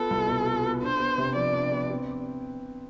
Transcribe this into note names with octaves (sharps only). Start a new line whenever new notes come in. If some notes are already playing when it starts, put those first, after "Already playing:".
Already playing: B3 F4 A4
C2
B2
F4
B3
D4 C5
B3
C3
F3 D5
D4
B3
C4